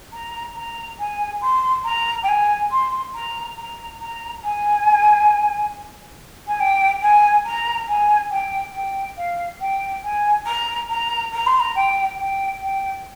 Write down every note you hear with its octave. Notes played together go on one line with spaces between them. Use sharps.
A#5
A#5
G#5
C6
A#5
G5
G#5
C6
A#5
A#5
A#5
G#5
G#5
G5
G#5
A#5
G#5
G5
G5
F5
G5
G#5
A#5
A#5
A#5
C6
A#5
G5
G5
G5